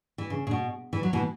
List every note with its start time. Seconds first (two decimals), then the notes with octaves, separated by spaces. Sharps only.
0.18 E3
0.30 C#3
0.47 C#3
0.51 B2
0.93 E3
1.03 F#3
1.13 B2 E3